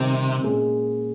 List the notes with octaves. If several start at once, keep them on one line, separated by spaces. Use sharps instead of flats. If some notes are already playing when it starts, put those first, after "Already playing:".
Already playing: C3 D#3 G3 C4 D#4
A#2 G#3 C#4